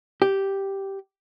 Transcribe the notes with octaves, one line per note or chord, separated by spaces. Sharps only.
G4